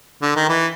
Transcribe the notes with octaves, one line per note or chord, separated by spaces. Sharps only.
D3
D#3
E3